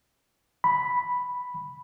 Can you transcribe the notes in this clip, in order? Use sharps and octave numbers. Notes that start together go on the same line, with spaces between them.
B5